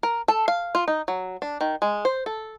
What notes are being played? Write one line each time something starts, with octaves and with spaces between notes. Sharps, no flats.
A#4
A4
F5
F4
D#4
F#3
D4
D#3
G#3
C5
A4